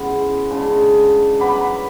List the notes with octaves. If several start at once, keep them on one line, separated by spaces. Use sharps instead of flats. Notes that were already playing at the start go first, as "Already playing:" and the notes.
Already playing: B2 G#3 C#4 E4
C#3 G#3 D4
F#3 B3 B5 D6